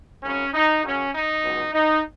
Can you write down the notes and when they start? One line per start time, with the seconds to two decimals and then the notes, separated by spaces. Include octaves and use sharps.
0.22 G#1 F#2 C#3 F#3 C#4
0.53 D#4
0.83 F#2 C#3 F#3 C#4
1.13 D#4
1.43 C#2 B2 F#3
1.73 D#4